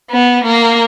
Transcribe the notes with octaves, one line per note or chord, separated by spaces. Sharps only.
B3
A#3